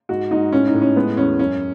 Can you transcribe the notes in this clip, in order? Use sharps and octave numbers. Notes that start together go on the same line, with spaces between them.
G#2 F#4
G#2 D#4
A2 C#4
D#4
A2
C#4
G#3 B3
E2 C#4
F#2 C#4